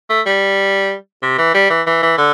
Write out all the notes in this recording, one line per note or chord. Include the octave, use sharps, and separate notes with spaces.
A3
G3
C3
E3
G3
E3
E3
E3
D3